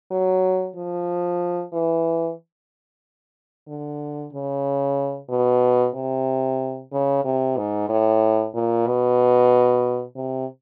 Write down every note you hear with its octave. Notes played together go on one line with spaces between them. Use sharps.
F#3
F3
E3
D3
C#3
B2
C3
C#3
C3
G#2
A2
A#2
B2
C3